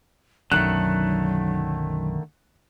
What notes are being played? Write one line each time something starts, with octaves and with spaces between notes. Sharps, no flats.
B1 F#2 D3 D#3 F#3 A3 F#6